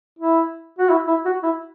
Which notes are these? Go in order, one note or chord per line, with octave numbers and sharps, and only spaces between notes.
E4
F#4
E4
E4
F#4
E4